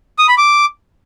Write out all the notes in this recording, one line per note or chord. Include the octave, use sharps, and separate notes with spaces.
D#6
B5
D6